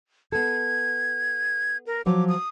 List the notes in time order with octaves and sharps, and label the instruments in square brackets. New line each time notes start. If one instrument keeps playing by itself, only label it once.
[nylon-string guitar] B3 A4 [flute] G#6
[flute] A#4
[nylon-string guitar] F3 F#3 C#5 [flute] D6
[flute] D#6